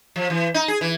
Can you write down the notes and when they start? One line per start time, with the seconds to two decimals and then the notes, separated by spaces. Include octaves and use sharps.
0.16 F3
0.30 E3
0.54 D#4
0.68 G#4
0.81 E3